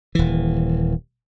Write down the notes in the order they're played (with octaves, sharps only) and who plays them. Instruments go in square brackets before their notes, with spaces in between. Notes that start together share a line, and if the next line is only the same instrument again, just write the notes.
[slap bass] D#1 E3